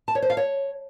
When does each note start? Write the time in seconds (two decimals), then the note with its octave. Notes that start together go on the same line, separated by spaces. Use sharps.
0.08 A5
0.15 C#5
0.22 C5
0.30 F5
0.37 C#5